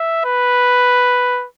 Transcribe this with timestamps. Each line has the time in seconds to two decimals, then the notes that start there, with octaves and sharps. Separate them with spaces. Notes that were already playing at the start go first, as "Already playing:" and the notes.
Already playing: E5
0.25 B4